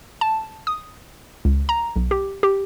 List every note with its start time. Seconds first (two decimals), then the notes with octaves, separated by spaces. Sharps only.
0.21 A5
0.67 D#6
1.45 C#2
1.69 A#5
1.96 B1
2.11 G4
2.43 G4